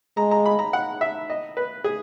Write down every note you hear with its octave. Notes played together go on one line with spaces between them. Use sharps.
G#3 A#5
A#5
B5
A#5
F#5
E5
D#5
B4
G#4